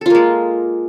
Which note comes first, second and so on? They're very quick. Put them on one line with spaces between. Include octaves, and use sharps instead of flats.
A4 F4 A#3 G#3